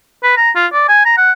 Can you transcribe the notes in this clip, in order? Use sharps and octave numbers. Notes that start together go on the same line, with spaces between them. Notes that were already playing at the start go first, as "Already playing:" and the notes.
B4
A#5
F4
D5
G#5
A#5
F#5